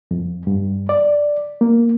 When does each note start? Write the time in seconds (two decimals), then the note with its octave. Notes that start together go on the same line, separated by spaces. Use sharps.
0.11 F2
0.47 G2
0.89 D5
1.61 A#3